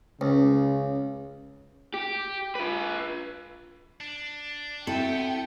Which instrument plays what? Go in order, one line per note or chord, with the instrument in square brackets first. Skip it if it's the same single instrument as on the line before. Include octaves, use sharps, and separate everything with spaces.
[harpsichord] C#2 [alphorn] C#3
[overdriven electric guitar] G4
F4 B4
[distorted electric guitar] D4
[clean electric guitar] C4 F#4 E5 [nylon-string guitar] E4 A4 [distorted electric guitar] F#5 B5 [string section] G5